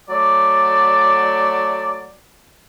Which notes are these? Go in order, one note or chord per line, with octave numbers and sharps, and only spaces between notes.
F#3 A3 D5